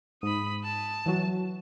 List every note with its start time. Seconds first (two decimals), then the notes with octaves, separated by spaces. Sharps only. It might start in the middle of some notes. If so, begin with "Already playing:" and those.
0.23 G#2 B5 D#6
0.64 A5
1.06 E3 F#3 F#4